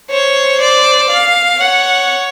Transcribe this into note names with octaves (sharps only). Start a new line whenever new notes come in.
C5 C#5
D5
F5
C#5 F#5